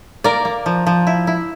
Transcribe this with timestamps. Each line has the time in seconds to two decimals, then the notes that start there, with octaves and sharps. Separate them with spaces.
0.24 A#3 A#4 D5
0.45 A#3
0.66 F3
0.86 F3
1.07 E4
1.27 E4